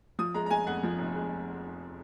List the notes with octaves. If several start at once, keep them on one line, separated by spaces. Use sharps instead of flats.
F3 D#6
G#3 A#5
A#5
G#3 G#5
F2 F#5
F3
F1
G#3